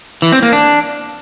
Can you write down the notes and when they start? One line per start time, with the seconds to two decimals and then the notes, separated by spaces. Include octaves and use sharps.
0.22 E3
0.32 C4
0.43 A#3
0.53 D4